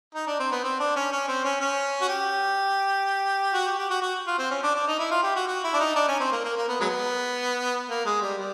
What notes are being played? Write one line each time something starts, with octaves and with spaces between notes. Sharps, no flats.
D#4
D4
C4
B3
C4
D4
C#4
C#4
C4
C#4
C#4
F#4
G4
F#4
G4
G4
F#4
F#4
F4
C4
C#4
D4
D4
D#4
E4
F4
G4
F#4
F#4
E4
D4
D#4
D4
C#4
C4
A#3
A#3
A#3
B3
F#3 G#3 B3
A#3
G#3
G3
G3